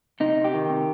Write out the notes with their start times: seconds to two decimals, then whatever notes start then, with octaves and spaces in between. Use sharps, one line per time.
0.20 C3 D#4
0.36 C3
0.44 G4
0.54 D#3
0.70 C3